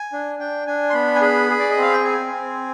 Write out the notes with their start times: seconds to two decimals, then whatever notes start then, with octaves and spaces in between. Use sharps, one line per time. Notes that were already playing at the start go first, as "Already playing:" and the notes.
Already playing: G#5
0.13 D4
0.39 D4 G5
0.67 D4 G#5
0.90 C6
0.94 B3 B5
1.16 G#5
1.22 G#4 B5
1.50 G#4
1.59 D5
1.71 D#5
1.77 C4 F5
1.93 G5
2.04 C4 G#5
2.32 C4